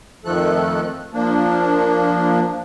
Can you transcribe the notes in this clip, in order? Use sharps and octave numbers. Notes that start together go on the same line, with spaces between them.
F2 D#3 F3 A3 A4 F#6
F3 A#3 D4